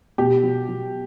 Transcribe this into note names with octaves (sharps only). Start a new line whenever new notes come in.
B2 G4
F#3
F#3